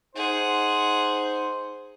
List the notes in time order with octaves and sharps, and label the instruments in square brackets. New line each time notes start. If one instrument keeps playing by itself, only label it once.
[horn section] D#4 C5 [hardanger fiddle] G#4 F#5